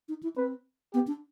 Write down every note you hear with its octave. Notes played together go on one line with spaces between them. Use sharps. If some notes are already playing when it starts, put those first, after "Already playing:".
D#4
E4
C4 B4
B3 G4
D4